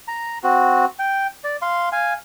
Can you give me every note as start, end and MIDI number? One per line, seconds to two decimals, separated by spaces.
0.08 0.38 82
0.44 0.86 60
0.44 0.86 66
0.99 1.27 79
1.44 1.56 74
1.62 1.89 77
1.62 1.89 84
1.92 2.14 77
1.92 2.14 80